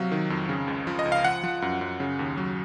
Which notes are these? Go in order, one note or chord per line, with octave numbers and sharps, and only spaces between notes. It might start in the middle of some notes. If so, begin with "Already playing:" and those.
Already playing: C3 F#3 F5
D#3
F2
C#3
C#2
F3
D#5
C#2
F5
F3 F#5
F3
F#2
F#2
C#3
D#2
F#3